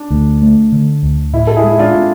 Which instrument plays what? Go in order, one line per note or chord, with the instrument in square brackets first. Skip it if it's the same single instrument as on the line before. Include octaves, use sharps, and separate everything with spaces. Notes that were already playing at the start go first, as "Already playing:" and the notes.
Already playing: [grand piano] D4
[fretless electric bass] D2
A3
D3
D2
[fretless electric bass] A2 [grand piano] E4
[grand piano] A4
E4 G#4
[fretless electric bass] G#3
[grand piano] E4
D4 F4
[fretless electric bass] C4